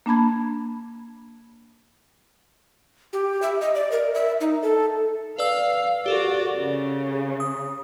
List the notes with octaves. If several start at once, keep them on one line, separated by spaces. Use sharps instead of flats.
A#3 D4 A5 B5 G#6
G4
E5
D#5
D5
A#4
E5
D#4
A4
B4 D5 F5 E6
F#4 G4 A4 A#4 D5
C#3
D#6